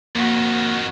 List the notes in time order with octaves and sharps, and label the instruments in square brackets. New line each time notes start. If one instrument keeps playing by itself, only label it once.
[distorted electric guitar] F2 D#3 [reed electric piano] A#3 [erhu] F#4